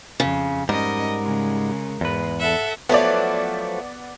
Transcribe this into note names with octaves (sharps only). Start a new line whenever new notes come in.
F2 C#3
G#2 G3 C#4 A#4 D#5
C#3 G#3
E2 G#2 G#3 B4
A4 E5 F#5
F3 F#3 A3 B3 D5